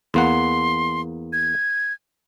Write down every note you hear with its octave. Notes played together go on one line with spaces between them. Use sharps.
E2 A#3 F#5 C6
G#6